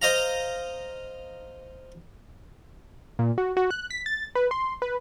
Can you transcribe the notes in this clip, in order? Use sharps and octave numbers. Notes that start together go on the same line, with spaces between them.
C5 D#5 F5 A#5
A#2
F#4
F#4
F#6
B6
A6
B4
C6
B4